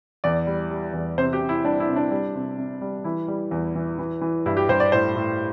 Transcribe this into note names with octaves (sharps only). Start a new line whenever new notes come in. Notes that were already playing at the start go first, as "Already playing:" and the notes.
E2 D5
G3
G3
E2
C3 C5
G4
C3
E4
G3 D4
E4
C3
D4
G3
C3
C3
G3
E3 E4
G3
E2
E3
E3
E3
G2 E4
G4
G2 C5
D5
A2 C5
A2